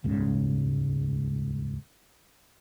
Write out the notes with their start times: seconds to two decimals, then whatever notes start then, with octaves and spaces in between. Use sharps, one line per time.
0.04 D#1 C#2 G#2 C#3